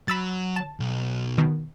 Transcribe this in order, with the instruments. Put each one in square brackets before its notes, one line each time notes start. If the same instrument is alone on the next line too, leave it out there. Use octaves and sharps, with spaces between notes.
[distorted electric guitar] F#3 [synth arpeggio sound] B5 E6 A6
[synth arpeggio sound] A5
[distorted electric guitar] B1
[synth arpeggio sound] B2 D#3